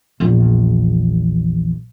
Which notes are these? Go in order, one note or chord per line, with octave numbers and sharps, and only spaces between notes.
A#1 E2